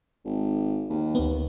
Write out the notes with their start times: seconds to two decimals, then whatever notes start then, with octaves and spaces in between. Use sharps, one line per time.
0.25 G#1
0.90 D#2
1.15 D2 B3